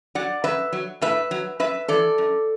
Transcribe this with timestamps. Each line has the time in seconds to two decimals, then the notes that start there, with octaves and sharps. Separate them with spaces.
0.15 F#3 D5 F#5
0.44 F#2 B4 E5
0.73 F#3
1.01 A2 B4 E5
1.31 F#3
1.60 F#2 B4 E5
1.88 E3 A4 D5
2.18 F#2